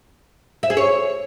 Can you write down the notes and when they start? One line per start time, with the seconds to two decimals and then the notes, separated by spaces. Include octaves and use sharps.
0.63 E5
0.70 G#4
0.77 C#5